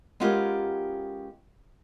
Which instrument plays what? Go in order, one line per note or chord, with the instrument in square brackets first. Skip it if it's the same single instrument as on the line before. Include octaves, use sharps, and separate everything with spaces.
[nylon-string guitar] G#3 B3 C#4 F4 G4 A#4